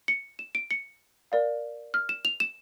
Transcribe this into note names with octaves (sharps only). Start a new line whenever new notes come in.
C#7
E7
D7
C#7
A#4 D5 F5
F6
E7
F7
E7